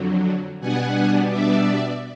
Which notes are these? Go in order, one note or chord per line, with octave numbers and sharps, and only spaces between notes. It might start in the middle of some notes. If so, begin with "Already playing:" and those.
Already playing: F2 D3 F#3
B2 G3 B3 D4 F#5 G#5
D5 E5